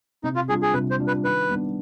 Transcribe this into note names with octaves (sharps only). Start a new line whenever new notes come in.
C3 D#4
F4
G3 D4 F4 G#4
G#4
C3 B4
C5
G3 D4 F4
B4
D#3 B4
G3 B3 D4